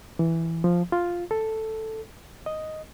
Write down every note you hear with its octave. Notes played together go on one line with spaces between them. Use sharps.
E3
F3
F4
A4
D#5